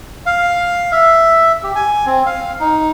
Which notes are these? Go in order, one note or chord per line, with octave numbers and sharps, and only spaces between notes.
F5
E5
G4
G#5
C4
F5
D#4